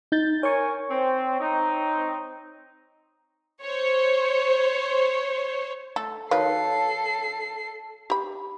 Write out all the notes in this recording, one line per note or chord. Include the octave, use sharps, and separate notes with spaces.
D#4 G6 A6
A#4 C#5 G#5 C#6
C4
C4 D#4
C5 C#5
A3 A4
D#3 F#4 A4 B4 C#5 F5 C7
G4 B5